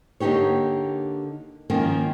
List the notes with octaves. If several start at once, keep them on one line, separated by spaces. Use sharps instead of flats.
D3 A#3 D#4 G4 C#5
D#3 F3 A#3 C#4